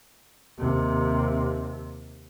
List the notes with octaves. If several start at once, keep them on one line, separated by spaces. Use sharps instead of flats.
D#2 C3